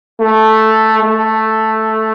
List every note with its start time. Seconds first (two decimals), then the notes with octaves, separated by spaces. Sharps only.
0.20 A3
1.03 A3